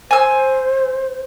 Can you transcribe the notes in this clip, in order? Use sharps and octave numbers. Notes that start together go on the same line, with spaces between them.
C5 G#5 E6